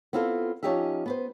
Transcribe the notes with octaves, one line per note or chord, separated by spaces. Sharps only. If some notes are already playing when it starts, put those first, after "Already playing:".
B3 C4 E4 F4 G#4 A4
F3 C#4 D#4 G4 D#5 E5
B3 B4 C5